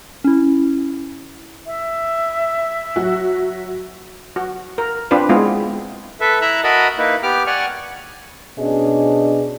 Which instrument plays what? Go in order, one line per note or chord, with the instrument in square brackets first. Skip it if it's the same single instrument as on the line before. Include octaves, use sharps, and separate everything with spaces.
[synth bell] C#4 E4
[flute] E5
[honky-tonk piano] F#3 F#4
[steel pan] F#4
A#4
C4 D4 F4 B4
G#3 B3 C4 E4 F4 G#4
[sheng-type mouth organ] A4 B4 E5
E4 E5 A#5 E6 F#6
F#4 A#4 D#5 A5 B5
A#3 D#4 E4 B4
B3 G4 D6 F6
D5 F#5 G#5 C#6 F6
[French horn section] B2 C#4 D4 G#4 D#5